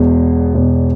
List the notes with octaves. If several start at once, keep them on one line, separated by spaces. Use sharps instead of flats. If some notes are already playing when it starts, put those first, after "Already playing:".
Already playing: E1 E2 B2
E1 E2 B2